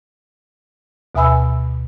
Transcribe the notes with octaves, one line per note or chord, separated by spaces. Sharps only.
D2 B2 E5 G#5 B5 E6